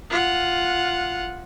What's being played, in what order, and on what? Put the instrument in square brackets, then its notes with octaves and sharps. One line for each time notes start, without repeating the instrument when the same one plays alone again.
[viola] F4 F#5